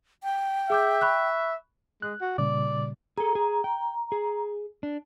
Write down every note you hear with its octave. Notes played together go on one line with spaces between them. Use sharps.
G5
G#4 E5 D6 G6
B5 C#6 F#6
G#3 F#6
F#4
A#2 C#3 G3 D5
G#4 A4 A#5
G#4
G5
G#4
D4